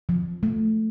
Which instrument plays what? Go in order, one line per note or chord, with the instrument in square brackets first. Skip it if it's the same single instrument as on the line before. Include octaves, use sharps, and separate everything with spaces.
[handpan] F3
A3